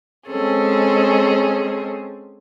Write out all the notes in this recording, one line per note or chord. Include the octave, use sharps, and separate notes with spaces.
G#3 C4 C#4 G#4 A4